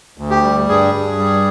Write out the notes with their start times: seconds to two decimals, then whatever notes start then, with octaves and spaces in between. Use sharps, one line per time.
0.18 D2
0.30 G4
0.43 G3
0.69 G2 G#4
0.94 G2
1.19 G3